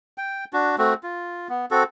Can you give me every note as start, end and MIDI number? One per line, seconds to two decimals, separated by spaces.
0.18 0.45 79
0.53 0.76 62
0.53 0.76 66
0.78 0.94 57
0.78 0.94 60
0.78 0.94 66
1.03 1.48 65
1.49 1.66 59
1.71 1.83 60
1.71 1.83 66
1.71 1.83 69